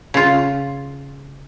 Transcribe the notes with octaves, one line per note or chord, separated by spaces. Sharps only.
C#3 F4